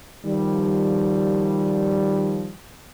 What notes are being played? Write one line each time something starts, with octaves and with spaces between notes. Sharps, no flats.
D#3 F3 G3